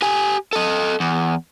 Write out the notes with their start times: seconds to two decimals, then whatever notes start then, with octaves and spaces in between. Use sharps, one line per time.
0.02 G4 G#5
0.53 A4 D#5
1.00 E2